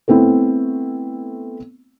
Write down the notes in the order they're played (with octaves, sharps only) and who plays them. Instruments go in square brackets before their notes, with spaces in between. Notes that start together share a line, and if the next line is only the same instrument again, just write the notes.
[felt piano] A3 B3 C4 E4